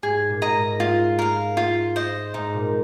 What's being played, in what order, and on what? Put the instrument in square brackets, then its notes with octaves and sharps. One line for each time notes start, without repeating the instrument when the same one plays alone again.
[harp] G#2 [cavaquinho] G#4
[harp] A#2
[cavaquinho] D#5 A#5
[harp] G#2
[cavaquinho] F4
A#4 F5
F4
C5 D#5
[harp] G#2 [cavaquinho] D#4
[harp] A#2